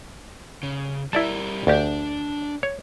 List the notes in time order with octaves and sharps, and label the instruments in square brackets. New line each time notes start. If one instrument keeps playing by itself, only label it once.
[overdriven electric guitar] C#3
[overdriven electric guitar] G3 A#4 [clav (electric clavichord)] E4 D5 A5
[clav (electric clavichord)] D2 G4 [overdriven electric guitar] D4
[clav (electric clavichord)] C#5